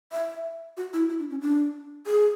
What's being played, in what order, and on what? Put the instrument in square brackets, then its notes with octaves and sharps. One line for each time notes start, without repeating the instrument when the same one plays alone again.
[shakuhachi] E5
F#4
E4
E4
D4
C#4
D4
G#4